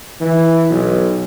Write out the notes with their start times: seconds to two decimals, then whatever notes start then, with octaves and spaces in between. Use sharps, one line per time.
0.21 E3
0.70 B1